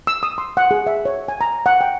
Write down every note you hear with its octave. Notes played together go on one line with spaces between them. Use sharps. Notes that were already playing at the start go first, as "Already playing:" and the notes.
E6
D#6
C6
F#5
G#4
E5
C#5
G#5
A#5
F#5
G5